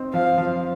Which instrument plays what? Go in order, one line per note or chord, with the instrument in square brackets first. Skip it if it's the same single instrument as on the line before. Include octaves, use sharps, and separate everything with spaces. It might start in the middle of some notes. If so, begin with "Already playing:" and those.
Already playing: [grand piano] C4 D#4
[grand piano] F3 [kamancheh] F5
[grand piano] F3